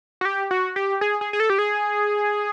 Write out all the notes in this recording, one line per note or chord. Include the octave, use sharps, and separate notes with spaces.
F#4
G4
F#4
G4
G#4
G#4
G#4
A4
G4
G#4